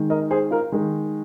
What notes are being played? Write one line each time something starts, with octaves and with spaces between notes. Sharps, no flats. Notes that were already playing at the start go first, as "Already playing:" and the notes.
Already playing: D#3 G#3
A#4 D#5
G#4 C5
F4 A#4
D#3 G#3